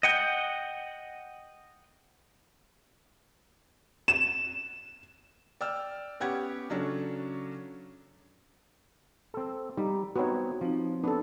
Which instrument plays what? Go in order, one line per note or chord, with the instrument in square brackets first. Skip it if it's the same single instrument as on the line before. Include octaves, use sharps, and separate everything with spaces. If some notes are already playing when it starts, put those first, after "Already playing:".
[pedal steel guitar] D#5 F#5 G5
[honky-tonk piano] E7
[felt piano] D5 G5 E6 F6
B3 C#4 G4 F#5 G#6
C#3 F#3 C#4 D4 A4
[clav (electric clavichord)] C4 A4
[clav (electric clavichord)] G3 [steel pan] D#4
[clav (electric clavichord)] B3 C4 D#4 [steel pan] F#4 C#5
[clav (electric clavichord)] F3 [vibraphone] C4 D#4
[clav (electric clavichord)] B3 [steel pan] D4 A4